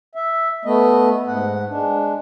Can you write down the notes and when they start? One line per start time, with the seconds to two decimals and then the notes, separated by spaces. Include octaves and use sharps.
0.15 E5
0.65 A3 B3 D#5
1.28 G#2 F#5
1.69 G#3 D4